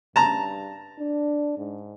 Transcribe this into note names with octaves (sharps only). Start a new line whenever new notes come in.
G2 A5 A#5
D4
G#2